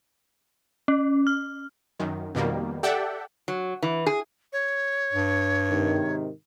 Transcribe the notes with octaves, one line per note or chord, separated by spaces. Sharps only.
C#4
F6
F#2 D#3
F2 B2 D#3 G3 A#3
G4 A4 D5 E5 F#5 G5
F#3
E3
G#4
C#5
G2
G#2 C3 D#3